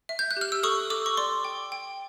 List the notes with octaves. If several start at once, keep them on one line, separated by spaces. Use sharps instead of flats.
E5
G6
F#6
G4 F6
E6
A4 C#6 D#6
A4 D6 E6
C#6
D5 C6 D6
G5
G5